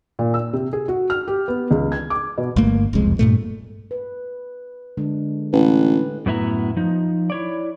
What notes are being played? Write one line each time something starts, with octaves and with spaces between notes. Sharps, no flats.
A#2
E6
C3
G#4
F#4
F6
G4
B3
C#2
G#6
D6
B2
G1 G2 A3 A#3
E1 C2 F2 G#3
G2 A#2 A3
B4
D3 G#3 D4
A1 B4
F#2 A2 B3 E4 E5 A#5
F3 D#4
E4 C#5 D5